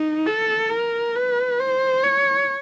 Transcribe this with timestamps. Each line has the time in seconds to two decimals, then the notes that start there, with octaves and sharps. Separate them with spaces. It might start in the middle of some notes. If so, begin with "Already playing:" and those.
Already playing: D#4
0.26 A4
0.71 A#4
1.16 B4
1.60 C5
2.03 C#5